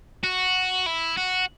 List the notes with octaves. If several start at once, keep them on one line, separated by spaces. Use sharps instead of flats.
F#4
E4
F#4